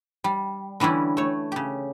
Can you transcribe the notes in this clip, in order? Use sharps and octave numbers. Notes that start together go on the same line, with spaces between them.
G3
D3 E3 G3 C#4 E4
A3 C#5
C#3 G4